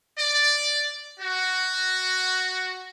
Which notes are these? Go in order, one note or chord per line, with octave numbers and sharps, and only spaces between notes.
D5
F#4